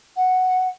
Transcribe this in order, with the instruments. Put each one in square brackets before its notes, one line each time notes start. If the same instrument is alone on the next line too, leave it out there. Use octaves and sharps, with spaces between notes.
[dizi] F#5